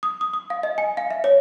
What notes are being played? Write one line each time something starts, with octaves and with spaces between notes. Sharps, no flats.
D#6
D#6
D#6
F5
D#5
G#5
F5
E5
C#5